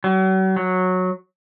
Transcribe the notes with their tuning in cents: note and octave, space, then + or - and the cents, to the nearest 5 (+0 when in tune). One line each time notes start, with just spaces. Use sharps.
F#3 +40
F#3 -10